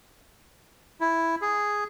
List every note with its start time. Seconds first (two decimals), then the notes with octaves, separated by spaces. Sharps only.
1.01 E4
1.42 G#4